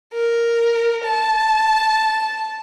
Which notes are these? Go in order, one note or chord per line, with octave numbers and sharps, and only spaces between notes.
A#4
A5